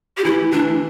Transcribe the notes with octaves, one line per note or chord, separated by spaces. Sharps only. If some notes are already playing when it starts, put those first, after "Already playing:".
G4
E3 E4
E3 D4